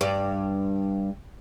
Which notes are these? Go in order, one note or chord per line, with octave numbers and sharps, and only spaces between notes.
G2 D5